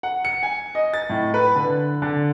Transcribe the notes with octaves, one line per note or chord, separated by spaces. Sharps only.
F#5
C#7
G#5
D#5
A6
A2
B4
D3
D3